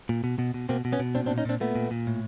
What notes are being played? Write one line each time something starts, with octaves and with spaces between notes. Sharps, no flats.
A#2
B2
B2
B2
B2 A#3 C4
B2
B3 C#4
B2
A#2 C4 D4
C4 D4
A#2
C#4 D#4
A#2 C4 D4
A#2 A3 B3
A#2
A#2
A2